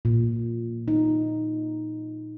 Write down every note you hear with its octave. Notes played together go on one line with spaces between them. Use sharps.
A#2
D#4